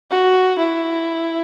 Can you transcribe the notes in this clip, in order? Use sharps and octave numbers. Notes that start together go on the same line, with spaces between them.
F#4
E4